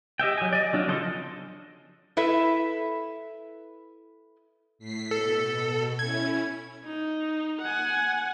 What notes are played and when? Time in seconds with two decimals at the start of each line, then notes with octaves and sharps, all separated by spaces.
0.19 G4 D#5 E5 G5
0.38 F#3 G#5
0.53 D5 D#5
0.73 F#3 D4 F4
0.88 C#3 F3 A4 C5 D#5
2.17 E4 A4 B4 E5
4.79 A2 B6 C7
5.11 B2 A4
5.99 C#4 E4 G#6
6.84 D#4
7.61 F#5 G#5